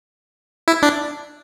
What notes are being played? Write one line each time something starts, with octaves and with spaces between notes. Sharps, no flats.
E4
D4